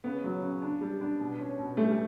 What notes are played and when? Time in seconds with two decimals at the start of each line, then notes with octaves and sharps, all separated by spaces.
0.04 C#3 B3
0.24 F#3
0.42 C#3
0.62 D4
0.81 G3
1.01 D4
1.20 B2
1.39 C#4
1.58 B2
1.77 G3 A3
1.92 A3